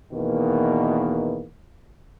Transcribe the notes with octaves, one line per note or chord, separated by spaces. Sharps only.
E2 B2 D#3 A#3